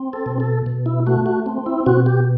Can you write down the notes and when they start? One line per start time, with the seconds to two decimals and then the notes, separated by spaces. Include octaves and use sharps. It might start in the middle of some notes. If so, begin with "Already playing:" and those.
Already playing: C4
0.13 A4
0.26 B2
0.40 A4
0.66 B2
0.86 E4
1.06 A3 F#4
1.26 F#4
1.46 C4
1.66 E4
1.86 B2 F#4
2.06 G4